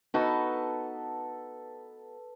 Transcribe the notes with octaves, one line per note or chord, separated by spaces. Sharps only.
B3 D#4 F#4 A4 B4